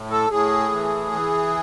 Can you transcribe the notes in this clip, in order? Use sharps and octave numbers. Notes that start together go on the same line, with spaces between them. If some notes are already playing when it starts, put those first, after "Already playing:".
Already playing: A2
A4
A2 G#4
E3
E3